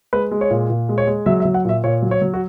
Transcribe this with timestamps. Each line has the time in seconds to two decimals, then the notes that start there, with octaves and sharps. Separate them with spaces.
0.13 G#3 B4
0.31 G#3
0.41 C#5
0.51 A#2
0.70 A#2
0.89 G#3
0.98 C#5
1.07 G#3
1.26 F#3 E5
1.40 E5
1.45 F#3
1.54 F#5
1.65 A#2 E5
1.84 A#2 C#5
2.02 F#3
2.11 C#5
2.22 F#3
2.34 F#4